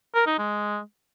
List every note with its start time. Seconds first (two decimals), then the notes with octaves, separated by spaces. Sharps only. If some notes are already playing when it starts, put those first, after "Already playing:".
0.14 A#4
0.26 D#4
0.38 G#3